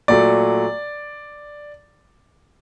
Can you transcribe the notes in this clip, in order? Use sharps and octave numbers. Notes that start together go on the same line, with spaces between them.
A#2 F#3 A3 D5